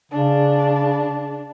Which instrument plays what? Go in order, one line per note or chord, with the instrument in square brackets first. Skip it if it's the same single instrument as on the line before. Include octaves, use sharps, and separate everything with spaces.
[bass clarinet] C#3 [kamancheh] D4